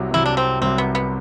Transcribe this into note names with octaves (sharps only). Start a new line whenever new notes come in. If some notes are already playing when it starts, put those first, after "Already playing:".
Already playing: C2 C3 F#3
C2 C3 F#3 E4
D4
C4
C2 C3 F#3 C4
B3
B3